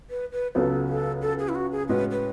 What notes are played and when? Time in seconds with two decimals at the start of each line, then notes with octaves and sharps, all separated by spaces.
0.10 B4
0.32 B4
0.55 C#2 C#3 F#3 B3 A4
0.89 A4
1.22 A4
1.39 G#4
1.49 E4
1.55 F#4
1.72 G#4
1.89 A2 G#3 C#4 F#4 B4
2.11 B4